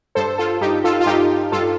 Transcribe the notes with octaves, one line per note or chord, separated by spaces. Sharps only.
G2 A4 C5
F4 A4
G2 D#4 G4
F4 A4
F4
G2 D#4 G4
G2 F4 A4